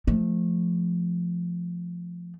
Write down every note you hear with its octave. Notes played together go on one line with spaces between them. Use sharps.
F3 A3